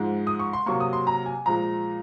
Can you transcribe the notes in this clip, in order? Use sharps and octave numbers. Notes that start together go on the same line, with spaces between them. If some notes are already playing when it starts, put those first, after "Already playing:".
Already playing: G#2 F3 G#3
D#6
C#6
C6
C3 F#3 A#3 C#6
D#6
C6
A#5
G#5
A#2 F3 G#3 A#5